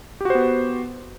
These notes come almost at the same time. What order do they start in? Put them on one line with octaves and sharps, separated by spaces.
G4 F#4 C5 B3